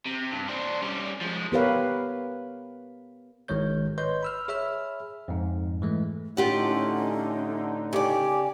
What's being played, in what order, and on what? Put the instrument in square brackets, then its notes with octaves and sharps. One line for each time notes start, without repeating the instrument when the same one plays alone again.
[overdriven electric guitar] C3
G2
D4 C5
G3 C#4
F3 G#3
[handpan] B3 G4 A#4 B4 C#5 F5
[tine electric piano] G#1 D#3 G#3 C#5 G6
B4 C#5 D#5 C6 G6
B5 E6 F6
G#4 C#5 E5 B5 E6 F6
F2 G#2
E3 G#3 A3
[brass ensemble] A2 D3 D#4 [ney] C#4 [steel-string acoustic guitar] F4 G4 F#5
[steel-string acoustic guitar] C#3 D5 [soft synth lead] G4 [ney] G#5